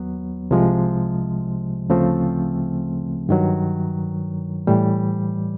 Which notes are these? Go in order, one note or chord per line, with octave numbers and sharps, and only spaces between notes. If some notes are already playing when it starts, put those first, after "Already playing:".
Already playing: D#2 F#3 B3
C2 C3 F3 G#3
D2 C#3 F3 A3 C4
G2 D#3 F#3
A2 E3 G3